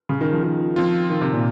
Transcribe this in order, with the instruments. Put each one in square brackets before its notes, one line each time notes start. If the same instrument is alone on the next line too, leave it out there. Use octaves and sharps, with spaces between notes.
[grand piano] C#3
D#3
F3
D#3
[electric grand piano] F3 C4 F4
[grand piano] D#3
C3
A#2